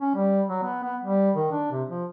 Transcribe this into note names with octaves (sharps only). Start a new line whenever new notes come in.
C#4
G3
F#3
B3
B3
G3
D#3
D4
C3
F3